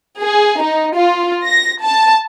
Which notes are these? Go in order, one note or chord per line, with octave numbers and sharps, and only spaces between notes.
G#4
D#4
F4
A#6
A5